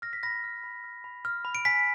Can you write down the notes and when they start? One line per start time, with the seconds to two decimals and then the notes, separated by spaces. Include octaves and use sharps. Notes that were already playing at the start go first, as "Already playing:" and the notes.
0.02 F6 A#6
0.13 B6
0.23 B5 A#6
0.44 F6
0.64 B5
0.84 F6
1.04 B5
1.25 F6
1.45 B5
1.55 D7
1.65 G#5 B6